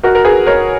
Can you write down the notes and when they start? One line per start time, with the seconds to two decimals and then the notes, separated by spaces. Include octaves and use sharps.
0.03 F#4 A#4
0.15 A#4
0.24 G#4 B4
0.47 A#4 C#5